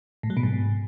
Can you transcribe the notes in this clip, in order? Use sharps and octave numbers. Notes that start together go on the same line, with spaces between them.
A2
F#3
B2
G#2